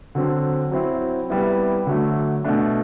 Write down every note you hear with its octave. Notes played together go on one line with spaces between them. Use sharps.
D3 F#3 C4
F#3 C4 E4
C3 G3 B3 E4
D3 F#3 A3
B2 A3 D4